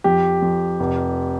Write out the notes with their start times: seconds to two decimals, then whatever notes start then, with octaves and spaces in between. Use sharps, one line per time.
0.04 F2 G4
0.42 F2
0.80 F1